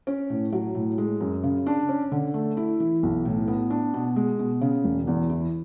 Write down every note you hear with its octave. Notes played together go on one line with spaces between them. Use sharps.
C#4
A2
F#3
A2
G#3
F#2
C#3
D4
C#4
D3
A3
E4
E3
B1
A2
B3
D4
B2
G#3
B2
C#3
E1
E2
E3